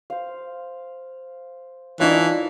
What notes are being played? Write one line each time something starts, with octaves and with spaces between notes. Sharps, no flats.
C5 F5
E3 D4 D#4 F4 C#5 A5 A#5